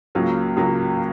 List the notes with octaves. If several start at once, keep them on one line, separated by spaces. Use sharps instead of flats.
C#2 C#3 F#3 A#3
C#2 C#3 F#3 A#3